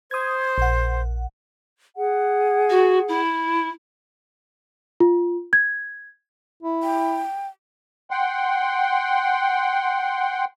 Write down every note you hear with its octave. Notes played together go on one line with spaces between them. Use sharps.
C5 D#6 G#6
A#1 F#5
G#4 F#5
F#4
E4
F4
G#6
E4
G5
F#5 G5 C6